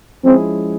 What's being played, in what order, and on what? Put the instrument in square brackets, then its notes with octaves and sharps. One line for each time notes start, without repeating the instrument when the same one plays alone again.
[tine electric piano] F3 G#3 C#4 E4 G#4 [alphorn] C4